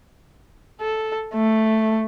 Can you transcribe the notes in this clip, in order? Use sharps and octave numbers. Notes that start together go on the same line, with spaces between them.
A4
A3